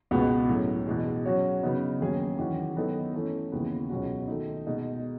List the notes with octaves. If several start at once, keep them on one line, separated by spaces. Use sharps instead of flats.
C#2 B2 G#3 B3 F#4
A2 F#3 C#4
E2 B2 G#3
F#3 C#4 F#4 C#5
C#3 F#3 B3 D#4
D#2 D#3 F#3 C#4 G#4
E2 D#3 F#3 C#4 F#4
D#3 F#3 B3 D#4 A4
E3 A3 C#4
D#2 C#3 E3 G#3 B3
C#2 B2 F#3 C#4 F#4
D#3 A3 D#4
B2 G#3 D#4